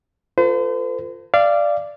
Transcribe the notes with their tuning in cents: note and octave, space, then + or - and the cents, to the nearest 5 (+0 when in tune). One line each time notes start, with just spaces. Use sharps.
F4 +5 A4 +40 C5 -40
D5 +0 F5 -25